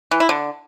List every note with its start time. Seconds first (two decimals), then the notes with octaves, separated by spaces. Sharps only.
0.11 E3
0.20 E4
0.29 D3